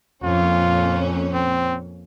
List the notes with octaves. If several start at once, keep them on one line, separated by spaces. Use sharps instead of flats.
F2 A#2 C#4 F4
C4